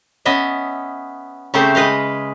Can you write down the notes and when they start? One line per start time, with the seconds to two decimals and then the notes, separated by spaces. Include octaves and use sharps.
0.25 B3 C#4 D#5 E5
1.54 C#3 A3 C4 G4 A4 C5
1.75 G#3 B4 D#5 F5